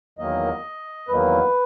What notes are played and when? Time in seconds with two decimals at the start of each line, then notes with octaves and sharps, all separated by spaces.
0.18 E2 D#3 F#3 A#3 D#5
1.08 E2 D#3 F#3 A#3 B4